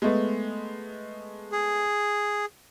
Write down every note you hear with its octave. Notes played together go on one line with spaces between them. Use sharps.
G#3 A3 B3
G#4